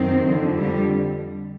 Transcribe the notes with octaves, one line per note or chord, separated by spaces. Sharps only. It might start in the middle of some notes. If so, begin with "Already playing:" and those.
Already playing: F#2 D#3 C4
F2 D3
G3